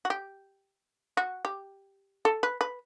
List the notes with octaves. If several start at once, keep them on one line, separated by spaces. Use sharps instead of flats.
F#4
G4
F#4
G4
A4
B4
B4